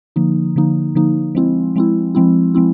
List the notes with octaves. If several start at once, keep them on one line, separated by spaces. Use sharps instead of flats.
D3 F3 A#3 D#4
D3 F3 A#3 D#4
D3 F3 A#3 D#4
F3 G#3 C4 E4
F3 G#3 C4 E4
F3 G#3 C4 E4
F3 G#3 C4 E4